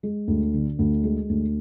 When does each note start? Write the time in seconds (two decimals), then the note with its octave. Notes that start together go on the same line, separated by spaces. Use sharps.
0.03 G#3
0.28 D2
0.54 D3
0.79 D2
1.04 G#3
1.29 D2